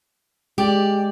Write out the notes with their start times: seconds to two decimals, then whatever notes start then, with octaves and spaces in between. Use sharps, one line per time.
0.58 G#3 G4 D5